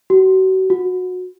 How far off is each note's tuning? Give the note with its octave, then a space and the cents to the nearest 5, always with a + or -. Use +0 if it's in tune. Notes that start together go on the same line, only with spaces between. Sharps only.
F#4 +35
F#4 -20